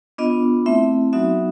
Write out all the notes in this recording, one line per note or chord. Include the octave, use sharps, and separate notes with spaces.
B3 D4 F4 D#5
A3 C4 E4 E5
F#3 B3 D#4 F#4 E5